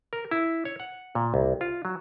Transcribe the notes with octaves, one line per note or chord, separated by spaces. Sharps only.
A#4
E4
C#5
F#5
A#2
C2
F4
F#3